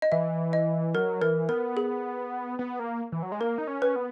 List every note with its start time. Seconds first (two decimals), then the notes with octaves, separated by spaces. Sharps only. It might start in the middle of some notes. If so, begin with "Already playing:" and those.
0.02 D#5
0.12 E3 E5
0.53 D#5
0.95 F#3 A#4
1.21 E3 A#4
1.49 B3 A#4
1.77 G#4
2.59 B3
2.79 A#3
3.12 E3
3.23 F#3
3.32 G#3
3.40 A#3 A#4
3.58 D#4
3.67 C#4
3.82 B4
3.96 B3